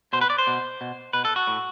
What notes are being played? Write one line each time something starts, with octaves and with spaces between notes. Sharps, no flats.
B2 C5
B4
D5
C5
B2
B2
B2 B4
A4
F#4
A2